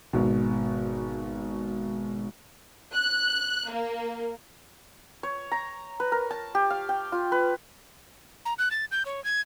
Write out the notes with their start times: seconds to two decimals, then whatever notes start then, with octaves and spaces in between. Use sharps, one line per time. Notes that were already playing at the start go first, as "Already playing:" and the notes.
0.13 G#1 B2
2.94 F#6
3.71 A#3
5.23 C#5
5.52 A#5
6.00 B4
6.12 A#4
6.31 A5
6.55 G4
6.70 F5
6.89 G5
7.12 F4
7.32 B4
8.45 A#5
8.59 F#6
8.71 A6
8.92 G6
9.06 C#5
9.24 G#6